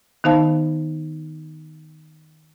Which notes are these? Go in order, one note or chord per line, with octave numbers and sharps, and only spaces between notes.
D#3 B3 D#4 C5 F5 A5